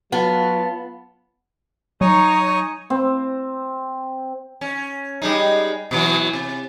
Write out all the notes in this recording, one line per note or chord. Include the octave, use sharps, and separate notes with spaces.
F#3 B3 F4 A5
F#3 D#4 C#5 G#5 C#6 D#6
C4
C#4
G3 G#3 D#4
B2 E3 F#3
C3